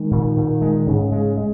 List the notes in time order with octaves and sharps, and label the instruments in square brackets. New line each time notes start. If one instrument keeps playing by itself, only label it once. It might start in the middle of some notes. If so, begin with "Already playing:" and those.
Already playing: [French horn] D#3 [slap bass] G#3
[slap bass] A#2
A#2
G#3
[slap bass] G#2 [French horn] C#3
[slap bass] G#3
G#3